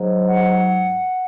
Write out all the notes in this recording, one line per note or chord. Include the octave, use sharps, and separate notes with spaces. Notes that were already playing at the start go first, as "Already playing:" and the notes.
Already playing: G#2 F#3
F#5